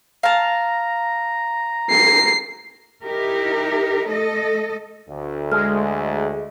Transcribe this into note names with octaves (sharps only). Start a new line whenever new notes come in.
F5 A5 A#5
C7
D#4 E4 G4 A#4
A3 A4 D#5
D2
G#3 F6